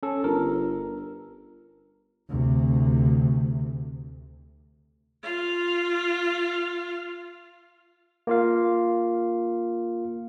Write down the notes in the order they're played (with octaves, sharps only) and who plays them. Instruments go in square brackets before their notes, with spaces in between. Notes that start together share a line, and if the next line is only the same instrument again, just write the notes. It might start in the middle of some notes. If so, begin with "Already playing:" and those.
[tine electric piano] C#4 A4
[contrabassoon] G1 [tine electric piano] A#4
[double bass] D2 C3
[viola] F4 F5
[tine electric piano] A#3 F4 F5